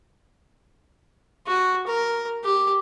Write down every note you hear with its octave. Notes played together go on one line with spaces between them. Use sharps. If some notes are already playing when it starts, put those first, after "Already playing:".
F#4
A#4
G4